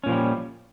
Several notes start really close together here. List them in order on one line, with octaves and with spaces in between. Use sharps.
C#4 A#2 F3 G3